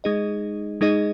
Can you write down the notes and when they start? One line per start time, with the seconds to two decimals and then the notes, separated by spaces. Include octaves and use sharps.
0.04 G#3 D#4 G#4 D#5
0.81 G#3 D#4 G#4 D#5